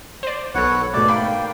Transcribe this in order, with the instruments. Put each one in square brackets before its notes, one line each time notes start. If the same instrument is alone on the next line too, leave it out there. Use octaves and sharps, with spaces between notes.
[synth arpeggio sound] C5 D5
[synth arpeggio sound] B1 A4 [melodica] B4 C#5 F#5
[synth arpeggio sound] G#2 B2 A3 [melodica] D5
[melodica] A#3 G5 [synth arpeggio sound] B5